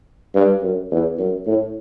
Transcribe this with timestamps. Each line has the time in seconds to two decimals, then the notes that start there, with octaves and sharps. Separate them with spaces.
0.35 G2
0.63 F#2
0.91 E2
1.19 F#2
1.47 A2